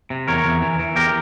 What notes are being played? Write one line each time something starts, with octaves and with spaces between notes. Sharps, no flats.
C3
E2 A#4 C#5
E2
E3
E3
E2 G4 A#4